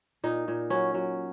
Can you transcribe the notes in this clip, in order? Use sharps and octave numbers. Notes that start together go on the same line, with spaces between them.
A#2 D#4
A#2
F#3 C#4
F#3